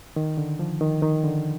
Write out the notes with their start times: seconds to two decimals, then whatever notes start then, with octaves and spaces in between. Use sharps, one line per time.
0.16 D#3
0.38 D3
0.59 F3
0.81 D#3
1.02 D#3
1.24 D3